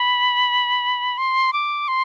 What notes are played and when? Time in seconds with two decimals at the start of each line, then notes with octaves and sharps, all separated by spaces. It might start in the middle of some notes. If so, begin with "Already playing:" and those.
Already playing: B5
1.18 C6
1.53 D6
1.88 C6